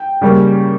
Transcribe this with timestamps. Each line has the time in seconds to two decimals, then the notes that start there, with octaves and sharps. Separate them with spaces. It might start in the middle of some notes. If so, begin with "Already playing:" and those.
Already playing: G5
0.21 C#3 G3 A#3 C#4